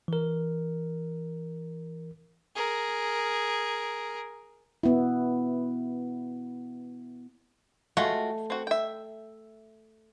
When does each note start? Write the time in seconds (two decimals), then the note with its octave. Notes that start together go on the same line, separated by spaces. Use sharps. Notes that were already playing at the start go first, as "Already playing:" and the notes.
0.08 E3 A#4
2.55 G#4 A#4
4.83 B3 E4
7.97 G#3 A3 F4 F#4
8.50 C4 F#4
8.67 E5 G5